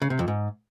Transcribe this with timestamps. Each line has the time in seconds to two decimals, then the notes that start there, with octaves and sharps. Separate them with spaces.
0.02 C#3
0.10 C3
0.19 F2
0.28 G#2